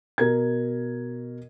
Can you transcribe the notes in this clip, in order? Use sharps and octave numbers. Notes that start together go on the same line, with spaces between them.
B2 A#4 G#6